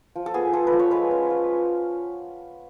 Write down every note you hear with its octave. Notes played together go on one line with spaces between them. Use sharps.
F3
A4
B3 G#4
F4 A4
B4
F3
C#5
G#3 B4
C#4
F4